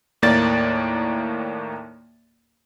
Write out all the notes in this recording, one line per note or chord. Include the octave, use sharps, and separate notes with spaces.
D#2 A2 A#3 D5 A6